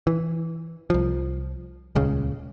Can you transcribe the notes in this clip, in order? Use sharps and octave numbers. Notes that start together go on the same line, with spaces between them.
E3
C2 F3
D#1 C#2 C#3